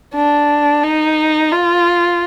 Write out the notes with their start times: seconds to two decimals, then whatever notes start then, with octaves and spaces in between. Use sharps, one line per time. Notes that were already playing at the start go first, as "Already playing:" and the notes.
0.15 D4
0.83 D#4
1.52 F4